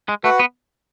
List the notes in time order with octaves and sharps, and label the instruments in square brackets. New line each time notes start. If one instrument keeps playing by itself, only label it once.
[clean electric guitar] G#3
[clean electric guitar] A3 [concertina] F#4 B4 F#5
[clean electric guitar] B3